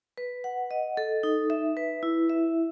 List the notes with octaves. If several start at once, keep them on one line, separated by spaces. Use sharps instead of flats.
B4
F#5
D#5
A4
D#4
E5
B4
E4
E5